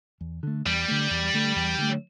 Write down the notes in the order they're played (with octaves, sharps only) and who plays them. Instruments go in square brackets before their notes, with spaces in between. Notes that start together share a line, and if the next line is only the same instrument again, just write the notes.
[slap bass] E2
D3 A3
[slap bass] E2 [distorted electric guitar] G3
[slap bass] D3 A3
E2
D3 A3
E2
D3 A3